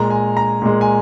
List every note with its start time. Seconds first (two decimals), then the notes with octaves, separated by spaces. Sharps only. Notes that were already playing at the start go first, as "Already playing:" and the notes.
Already playing: A#2 G#3 A#5
0.10 G#5
0.37 A#5
0.62 A#2 G#3
0.81 G#5